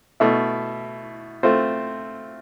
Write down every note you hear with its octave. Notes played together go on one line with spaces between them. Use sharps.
B2 A3 E4
A3 C4 F4 C5